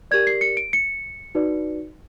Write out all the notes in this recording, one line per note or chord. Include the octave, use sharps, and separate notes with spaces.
G4 A#4 D5 G#6
C7
C#7
D7
C#7
D#4 F#4 B4 D5